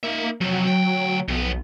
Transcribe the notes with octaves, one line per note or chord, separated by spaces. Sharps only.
A#3 D#4 E5
F2 C3 F#3
D2 G5
B1 F2 B3